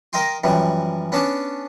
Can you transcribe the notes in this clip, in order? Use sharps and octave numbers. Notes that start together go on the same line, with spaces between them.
A#4 D#5 F5 G5 C6
F#2 E3 F3 G3
B3 C#4 D4 D5 A5